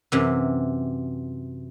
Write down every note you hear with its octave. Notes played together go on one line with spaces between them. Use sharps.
F#2 C3 E3